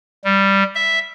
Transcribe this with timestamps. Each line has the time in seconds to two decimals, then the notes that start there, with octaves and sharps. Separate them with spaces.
0.24 G3
0.75 E5